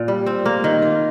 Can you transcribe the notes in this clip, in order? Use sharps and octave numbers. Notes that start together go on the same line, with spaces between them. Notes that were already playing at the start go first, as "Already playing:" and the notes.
Already playing: A#2
G3
C4
A#3
D#3
F4